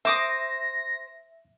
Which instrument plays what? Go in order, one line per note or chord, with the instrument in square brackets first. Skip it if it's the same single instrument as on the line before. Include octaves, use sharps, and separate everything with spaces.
[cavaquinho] C5 D6 D#6 [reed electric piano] E5 [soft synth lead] A#6